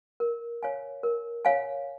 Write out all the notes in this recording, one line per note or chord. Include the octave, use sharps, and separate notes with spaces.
A#4
C#5 F5 G#5
A#4
C#5 F5 G#5